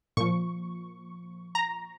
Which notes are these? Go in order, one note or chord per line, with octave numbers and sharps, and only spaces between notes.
A#2 F3 C#6
A#5